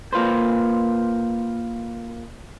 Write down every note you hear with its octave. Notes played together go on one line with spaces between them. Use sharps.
A#3 F4 B4 C5